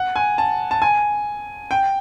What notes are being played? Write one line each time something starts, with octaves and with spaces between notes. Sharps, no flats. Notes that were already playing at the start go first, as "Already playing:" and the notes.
Already playing: F#5
G#5
A5
A5
G#5
G5